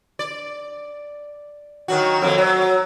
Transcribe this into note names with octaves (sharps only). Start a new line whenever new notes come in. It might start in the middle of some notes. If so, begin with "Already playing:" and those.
D5
D#3 F#3 F#4
F2 F#3 A#3
F#3